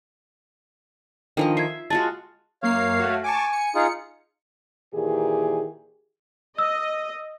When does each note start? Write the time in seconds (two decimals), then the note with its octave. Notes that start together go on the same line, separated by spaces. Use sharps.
1.37 D#3 F3 D4 A4 D#5 G5
1.57 E5 G#6 C7
1.90 G#3 F4 F#4 A5 A6
2.63 F#2 A#3 C#5 F5 C7
3.00 A3 F#4
3.24 G#5 A5 C#6 D6
3.53 C#7
3.75 D#4 F4 G#4
4.92 A#2 D#3 E3 G4 G#4
6.58 D#5 E6